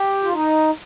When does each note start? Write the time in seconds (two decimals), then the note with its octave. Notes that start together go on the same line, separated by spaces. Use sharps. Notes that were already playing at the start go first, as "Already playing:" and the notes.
Already playing: G4
0.23 F4
0.33 D#4